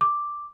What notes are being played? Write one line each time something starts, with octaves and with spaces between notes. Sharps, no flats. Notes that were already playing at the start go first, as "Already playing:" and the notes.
D6